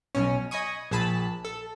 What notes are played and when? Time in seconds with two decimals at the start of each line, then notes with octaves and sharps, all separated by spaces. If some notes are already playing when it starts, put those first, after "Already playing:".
0.15 B1 B2 C#4
0.51 D#5 G#5 B5 C#6 D#6
0.91 A#1 G#4 A5 B5 B6
1.45 A4